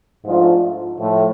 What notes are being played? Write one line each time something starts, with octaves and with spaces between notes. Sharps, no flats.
G#2 F3 A3 D4 F4
A2 F3 A3